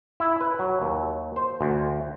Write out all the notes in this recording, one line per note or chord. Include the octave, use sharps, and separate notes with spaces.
E4
B4
F#3
D#2
C5
D2